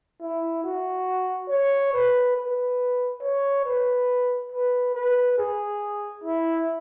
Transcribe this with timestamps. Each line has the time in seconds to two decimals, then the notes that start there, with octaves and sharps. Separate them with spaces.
0.21 E4
0.63 F#4
1.49 C#5
1.93 B4
2.36 B4
3.22 C#5
3.65 B4
4.52 B4
4.94 B4
5.38 G#4
6.24 E4